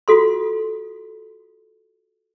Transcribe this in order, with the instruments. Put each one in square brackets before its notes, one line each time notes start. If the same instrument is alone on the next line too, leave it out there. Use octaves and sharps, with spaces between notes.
[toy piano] F4 F#4 A4 C6